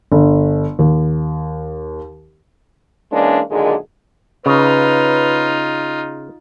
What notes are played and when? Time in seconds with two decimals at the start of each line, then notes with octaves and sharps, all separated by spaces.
0.12 G1
0.79 D#2
3.12 E3 G#3 A#3 C#4 D4
3.50 F#2 A#2 D3 D#3 G#3
4.46 C#3 D#4 F4 B4